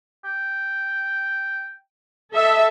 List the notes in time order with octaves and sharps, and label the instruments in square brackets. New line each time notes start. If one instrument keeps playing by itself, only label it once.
[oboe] G5
[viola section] A4 E5 [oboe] D#5